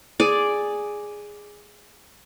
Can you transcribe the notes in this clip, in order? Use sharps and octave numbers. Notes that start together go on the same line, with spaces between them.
G#4 D5